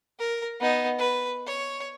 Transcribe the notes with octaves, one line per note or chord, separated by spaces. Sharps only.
A#4
B3 D#4
B4
C#5